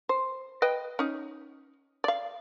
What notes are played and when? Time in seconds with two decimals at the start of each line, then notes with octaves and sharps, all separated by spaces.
0.09 C5
0.62 B4 D#5 G5
0.99 C#4 D#4
2.04 D5 F5